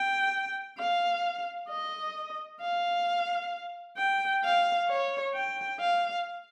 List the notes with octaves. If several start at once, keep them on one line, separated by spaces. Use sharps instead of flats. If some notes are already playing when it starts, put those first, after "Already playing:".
Already playing: G5
F5
D#5
F5
G5
F5
C#5
G5
F5